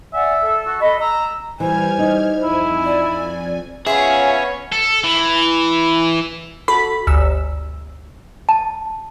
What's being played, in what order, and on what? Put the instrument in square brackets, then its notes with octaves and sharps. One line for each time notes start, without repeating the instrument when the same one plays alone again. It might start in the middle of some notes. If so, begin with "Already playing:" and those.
[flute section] D5 F#5 G#5 [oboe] E5
[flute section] A4
[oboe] F#4
[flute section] A4 D#5 [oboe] B5
[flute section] A#5 [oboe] E6
[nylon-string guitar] E3 [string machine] G3 F6 G#6 [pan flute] C5 [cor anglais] G#5
[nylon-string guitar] D#4
[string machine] F2 G#5 [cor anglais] E4
[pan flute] D5
[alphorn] B3 [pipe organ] C#4 C#5 [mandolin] F4 E5 [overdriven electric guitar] G#4
[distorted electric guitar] A4
E3
[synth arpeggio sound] F#4 A4 B5 B6
G1 D2 E6
[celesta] A5